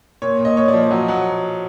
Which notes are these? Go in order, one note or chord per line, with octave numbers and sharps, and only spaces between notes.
A#2 C#5
A#2
D#5
A#2 C#5
D5
F3
D5
F#3 D#5
F#3 F#5